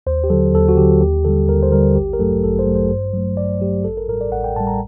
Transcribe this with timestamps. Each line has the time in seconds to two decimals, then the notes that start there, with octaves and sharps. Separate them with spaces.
0.07 D#2 C5
0.24 G4
0.30 D3 F#3 A4
0.54 D#2 A4
0.69 F#4
0.77 D3 F#3 G4
1.01 D#2 G4
1.25 D3 G3 A4
1.48 D#2 A#4
1.63 C5
1.72 D3 G3 A#4
1.95 A1 G4
2.13 A#4
2.19 G2 F#3 A3 A4
2.44 A1 A4
2.59 C5
2.67 G2 F#3 A3
2.75 C5
2.90 G2
3.14 F#3 A3
3.37 G2 D5
3.61 F#3 A3 G4
3.84 A1 A4
3.97 A#4
4.08 A2 G3 A#4
4.21 D5
4.32 A1 F#5
4.44 G5
4.56 A2 G3 A5
4.67 A#5